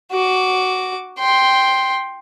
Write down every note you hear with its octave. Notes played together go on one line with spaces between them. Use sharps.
F#4 D6
G5 C6